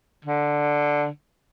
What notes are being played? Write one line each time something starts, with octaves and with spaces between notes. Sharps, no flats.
D3